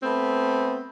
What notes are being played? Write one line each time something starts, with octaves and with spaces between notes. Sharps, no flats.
A3 B3 C4